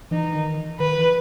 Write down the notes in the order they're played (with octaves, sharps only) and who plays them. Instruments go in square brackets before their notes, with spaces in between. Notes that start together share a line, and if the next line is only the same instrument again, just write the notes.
[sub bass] E3 [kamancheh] D#4
[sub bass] D#3
[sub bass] D#3 [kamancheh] B4
[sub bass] E3